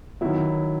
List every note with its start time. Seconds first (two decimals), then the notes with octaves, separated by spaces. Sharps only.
0.21 D#3 F#3 B3 E4